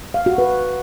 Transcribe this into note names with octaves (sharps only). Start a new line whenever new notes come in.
F5
F#4
B4